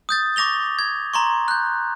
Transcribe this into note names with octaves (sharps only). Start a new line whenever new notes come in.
D#6 G6 A6
C#6 D6 A#6 F7 G7
G#6
A#5 C6 C#6
F#6 G6